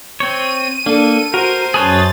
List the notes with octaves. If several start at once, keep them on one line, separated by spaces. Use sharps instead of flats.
C4 C#5 D#7
A#3 D4 A4
F#4 A#4 C5
F#2 G#4 B4 C#5 A5 D#6 A6